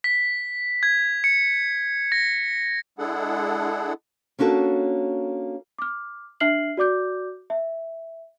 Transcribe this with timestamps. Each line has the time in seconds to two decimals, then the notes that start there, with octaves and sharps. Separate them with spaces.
0.04 B6
0.83 G#6
1.24 C#7
2.12 A#6
2.98 G#3 D4 E4 G#4 A4 F#5
4.39 A#3 C#4 D4 F#4 A4
5.78 D6 F6
6.40 D4 E5 F6 C7 F#7
6.77 F#4 D5 D6 G6
7.50 E5